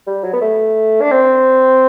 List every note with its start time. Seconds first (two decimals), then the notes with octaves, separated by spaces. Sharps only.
0.07 G3
0.24 F#3
0.33 B3
0.41 A3
1.01 D4
1.11 C4